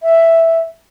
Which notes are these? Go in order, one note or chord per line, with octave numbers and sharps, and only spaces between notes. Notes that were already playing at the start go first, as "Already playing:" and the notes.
E5